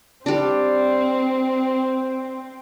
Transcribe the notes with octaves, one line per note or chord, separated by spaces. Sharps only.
G3 C4 D4